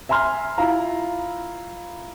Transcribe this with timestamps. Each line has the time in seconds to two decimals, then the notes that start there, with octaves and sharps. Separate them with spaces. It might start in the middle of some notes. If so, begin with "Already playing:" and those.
0.09 E5 G#5 A#5 C6 F6
0.58 E4 F4 F5 A#5